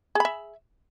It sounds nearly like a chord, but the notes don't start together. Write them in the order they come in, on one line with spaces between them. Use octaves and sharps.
G#4 B5 E5